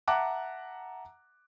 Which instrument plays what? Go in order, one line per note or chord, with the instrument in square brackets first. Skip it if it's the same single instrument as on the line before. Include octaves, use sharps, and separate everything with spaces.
[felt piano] E5 F#5 A5 A#5 D6 F#6